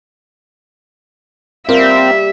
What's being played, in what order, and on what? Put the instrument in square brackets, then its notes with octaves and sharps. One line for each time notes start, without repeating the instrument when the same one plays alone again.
[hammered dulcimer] G3 A#3 G4 [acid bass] C4 [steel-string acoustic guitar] F4 A#4 [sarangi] E5